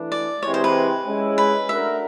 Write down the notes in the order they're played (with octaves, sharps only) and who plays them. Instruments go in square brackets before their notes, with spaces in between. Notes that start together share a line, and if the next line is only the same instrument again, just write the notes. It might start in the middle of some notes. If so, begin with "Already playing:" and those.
Already playing: [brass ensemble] E3 A3 D4
[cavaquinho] D5
[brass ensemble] C3 E3 G#3 [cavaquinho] C#5
[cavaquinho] C5
B4
[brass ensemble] G#3 C#4 E4
[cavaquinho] B4
[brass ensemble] A3 D4 F#4 A#4 [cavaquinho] E5